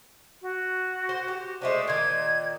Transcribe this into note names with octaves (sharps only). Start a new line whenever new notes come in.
F#4
C5
G4
G#3 A3 D4 C5
A#2 D#3 G#6